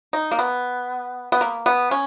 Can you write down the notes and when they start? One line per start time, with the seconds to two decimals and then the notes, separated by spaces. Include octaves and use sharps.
0.13 D#4
0.31 A#3
0.39 B3
1.32 B3
1.41 A#3
1.66 B3
1.91 C#4